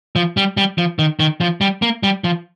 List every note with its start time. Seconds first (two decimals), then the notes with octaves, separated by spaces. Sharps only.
0.16 F3
0.37 G3
0.57 G3
0.78 F3
0.99 D#3
1.20 D#3
1.41 F3
1.61 G3
1.82 A#3
2.03 G3
2.24 F3